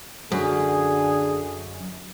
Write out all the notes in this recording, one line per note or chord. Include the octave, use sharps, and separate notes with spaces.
F#2 D3 G#4